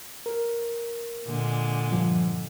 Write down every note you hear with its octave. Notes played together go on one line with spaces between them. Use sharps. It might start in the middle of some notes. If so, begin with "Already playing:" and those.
A#4
A#2 D3 G#3
G2 F3